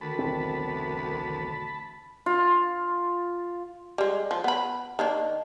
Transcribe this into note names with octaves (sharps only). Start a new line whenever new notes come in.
D2 D#3 A5 B5
B1 E2 C4
F4
G3 G#3
F3
B3 B5
D#3 A#3 D4